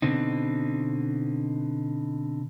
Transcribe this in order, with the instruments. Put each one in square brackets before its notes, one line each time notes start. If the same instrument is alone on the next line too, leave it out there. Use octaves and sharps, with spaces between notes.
[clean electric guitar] B2 D3 C4 D#4